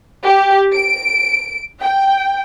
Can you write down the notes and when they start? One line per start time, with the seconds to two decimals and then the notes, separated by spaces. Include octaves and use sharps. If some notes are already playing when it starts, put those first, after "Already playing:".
0.24 G4
0.73 D7
1.82 G5